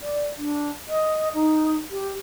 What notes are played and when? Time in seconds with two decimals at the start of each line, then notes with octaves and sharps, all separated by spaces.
0.01 D5
0.37 D4
0.89 D#5
1.34 D#4
1.91 G4